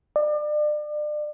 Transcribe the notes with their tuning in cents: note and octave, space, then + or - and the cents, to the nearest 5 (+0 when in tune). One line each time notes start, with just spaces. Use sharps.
D5 +35